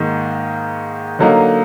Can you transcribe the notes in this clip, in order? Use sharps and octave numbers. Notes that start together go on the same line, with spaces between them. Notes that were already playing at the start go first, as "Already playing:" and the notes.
Already playing: G#2 D#3 A#3 D#4
D3 F#3 A#3 D#4